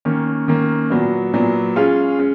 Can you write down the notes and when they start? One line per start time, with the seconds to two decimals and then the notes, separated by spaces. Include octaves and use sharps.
0.05 D#3 A#3 C#4
0.48 D#3 A#3 C#4
0.90 A#2 F#3 B3
1.34 A#2 F#3 B3
1.76 G#3 C#4 F4 G#4
2.18 G#3 C#4